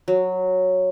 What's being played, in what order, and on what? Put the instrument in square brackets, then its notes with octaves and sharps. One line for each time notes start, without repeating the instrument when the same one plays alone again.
[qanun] F#3